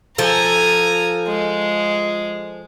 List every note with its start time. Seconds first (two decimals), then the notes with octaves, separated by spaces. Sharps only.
0.18 F3 A4 G#5 A#5
1.28 G#3